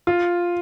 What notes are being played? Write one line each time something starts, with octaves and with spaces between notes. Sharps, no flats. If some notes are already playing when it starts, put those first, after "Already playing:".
F4